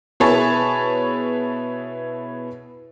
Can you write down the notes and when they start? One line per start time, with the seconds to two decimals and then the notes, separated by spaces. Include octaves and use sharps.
0.20 B2 E4 G#4 B4 C#5 A5